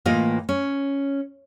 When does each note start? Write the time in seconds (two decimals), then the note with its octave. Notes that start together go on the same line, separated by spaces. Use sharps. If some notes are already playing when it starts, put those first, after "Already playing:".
0.05 A2 E3 A#3 F4 D#5
0.49 C#4